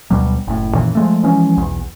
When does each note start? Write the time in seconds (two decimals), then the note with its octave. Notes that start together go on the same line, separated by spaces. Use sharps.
0.10 D2 B2 F#3 G3
0.47 F#1 A2
0.75 F#2 A#2 D#3 E3
0.95 F3 G#3 A3
1.23 E3 F3 G#3 C#4
1.57 B1 E2